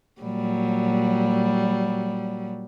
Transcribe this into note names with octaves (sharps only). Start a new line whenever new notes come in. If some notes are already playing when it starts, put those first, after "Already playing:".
A#2 F#3 G3